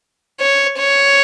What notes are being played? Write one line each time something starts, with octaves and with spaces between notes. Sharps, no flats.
C#5
C#5